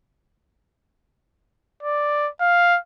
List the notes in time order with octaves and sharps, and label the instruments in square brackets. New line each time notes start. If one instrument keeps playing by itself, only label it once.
[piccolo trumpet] D5
F5